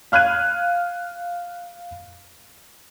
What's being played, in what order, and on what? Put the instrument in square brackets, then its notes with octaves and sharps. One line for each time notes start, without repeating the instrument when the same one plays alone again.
[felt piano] F5 F6 F#6 G#6 D#7